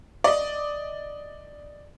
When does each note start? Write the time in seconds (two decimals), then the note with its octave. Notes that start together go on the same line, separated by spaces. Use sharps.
0.24 D5 D#5